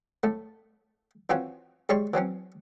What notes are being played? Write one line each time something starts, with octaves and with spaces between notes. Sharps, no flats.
A2 A3
E3 C4 C#4 F4 F#4 C#5
G#2 G3 C#5 C6 C#6
E3 F#3 C4 C#4